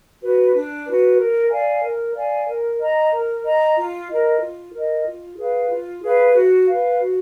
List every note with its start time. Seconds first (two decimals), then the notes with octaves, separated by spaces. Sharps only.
0.22 F#4 B4
0.54 D4
0.87 F#4 B4
1.19 A#4
1.51 D5 F5 G#5
1.83 A#4
2.16 D5 F5 G#5
2.48 A#4
2.80 D#5 A#5
3.12 A#4
3.44 D#5 A#5
3.77 F4
4.09 A#4 D#5
4.42 F4
4.74 A#4 D#5
5.06 F4
5.37 G#4 B4 F5
5.70 F4
6.02 G#4 B4 F5
6.35 F#4
6.67 B4 F5
6.99 F#4